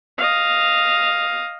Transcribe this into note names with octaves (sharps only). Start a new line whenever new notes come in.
D#5 F5